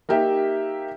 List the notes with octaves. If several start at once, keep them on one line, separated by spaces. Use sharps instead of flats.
A#3 D#4 G4 E5